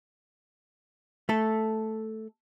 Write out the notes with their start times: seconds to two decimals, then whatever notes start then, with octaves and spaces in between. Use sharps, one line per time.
1.29 A3 A4